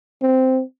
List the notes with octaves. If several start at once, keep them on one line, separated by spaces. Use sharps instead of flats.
C4